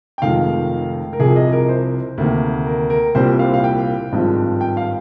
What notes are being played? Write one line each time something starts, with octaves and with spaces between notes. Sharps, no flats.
G5
F1 F2 D#3 G#3 F5
A#4
C2 C3 F3 G#4
D#5
A#4
C5
D2 C3 D#3 A#3
A#4
A#4
C2 A#2 G3 C4 C5
F5
F5
G5
G#1 G2 F3 G#3 C4
G5
F5